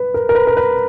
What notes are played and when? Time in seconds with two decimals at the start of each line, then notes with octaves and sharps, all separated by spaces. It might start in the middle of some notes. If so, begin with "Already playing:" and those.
Already playing: B4
0.14 A#4
0.29 A#4
0.35 B4
0.47 A#4
0.57 B4